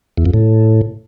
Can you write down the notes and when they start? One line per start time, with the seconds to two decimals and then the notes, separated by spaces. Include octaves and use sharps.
0.17 E2
0.26 F2
0.34 A2